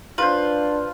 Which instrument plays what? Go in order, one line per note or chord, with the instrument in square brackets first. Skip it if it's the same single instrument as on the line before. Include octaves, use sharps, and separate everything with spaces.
[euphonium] D4 [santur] F4 C5 [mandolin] B4